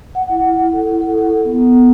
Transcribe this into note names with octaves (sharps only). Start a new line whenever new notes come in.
F#5
E4
E4
F#5
A4
E4
A4
A4
A4
B3
B3
B3